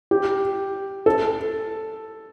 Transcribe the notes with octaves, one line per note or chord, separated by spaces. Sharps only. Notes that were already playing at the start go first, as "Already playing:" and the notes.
G4
A4